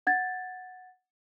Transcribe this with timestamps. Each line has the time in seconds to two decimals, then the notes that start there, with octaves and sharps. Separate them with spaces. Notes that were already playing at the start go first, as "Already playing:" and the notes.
0.07 F#5 G#6 A6